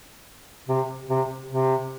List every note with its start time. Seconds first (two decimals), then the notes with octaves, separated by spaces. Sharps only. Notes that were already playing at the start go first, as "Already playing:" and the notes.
0.68 C3
1.09 C3
1.50 C3